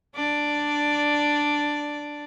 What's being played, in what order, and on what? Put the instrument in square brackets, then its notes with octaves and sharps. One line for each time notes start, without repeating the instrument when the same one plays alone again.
[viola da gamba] D4 D5